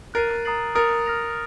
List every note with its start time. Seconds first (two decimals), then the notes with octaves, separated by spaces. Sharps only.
0.14 A#4 F#6 A6 C7 D#7
0.45 A#5 D#6 A6 C7 F#7
0.75 A#4 D#6 A6 C#7 F7
1.06 F6 A#6 F7